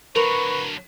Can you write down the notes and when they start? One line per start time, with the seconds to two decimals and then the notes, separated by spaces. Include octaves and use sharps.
0.16 D3 F#3 A#4 B4 C#6